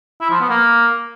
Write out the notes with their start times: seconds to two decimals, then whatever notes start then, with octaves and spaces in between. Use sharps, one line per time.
0.21 E4
0.31 F3
0.40 B3
0.50 A#3